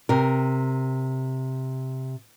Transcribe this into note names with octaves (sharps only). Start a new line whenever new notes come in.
C3 A#4